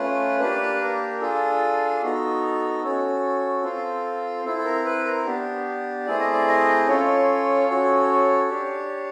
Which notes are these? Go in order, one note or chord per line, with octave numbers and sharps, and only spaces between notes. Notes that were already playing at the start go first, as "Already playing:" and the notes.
Already playing: A3 C#4 F4 B4
A#3 D4 G4 B4
A#4
D4 F4 G#4 A4
B3 D#4 F#4 A4
C#4 F#4 A4
C4 F4 A4
C4 E4 A4
A4
A#4
B4
A#4
B3 D4 G4
A3 C4 E4 G#4 D5
D#5
D5
D#5
C#4 F4 A4 C#5
C#4 F#4 A4
D4 G4